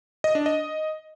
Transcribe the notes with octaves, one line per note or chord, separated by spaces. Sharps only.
D#5
D4
D#5